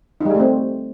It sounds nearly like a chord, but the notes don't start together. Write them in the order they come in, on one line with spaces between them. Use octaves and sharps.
D#4 G3 G#4 A3 C4